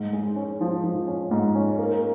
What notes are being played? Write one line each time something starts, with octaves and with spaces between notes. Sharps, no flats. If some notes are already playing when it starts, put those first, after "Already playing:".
Already playing: G#2
G#3
C#4
F3
F3
C#4
G#2
C#4
A#3